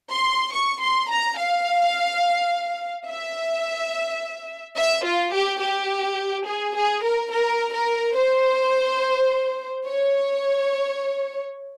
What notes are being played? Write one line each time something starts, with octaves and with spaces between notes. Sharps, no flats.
C6
C#6
C6
A#5
F5
E5
E5
F4
G4
G4
G#4
G#4
A#4
A#4
A#4
C5
C#5